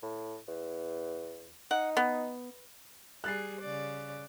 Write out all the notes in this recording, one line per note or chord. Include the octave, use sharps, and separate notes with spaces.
A2
E2
D#4 F#5
B3
G3 G#4 F#6 A6 C7
C#3 D5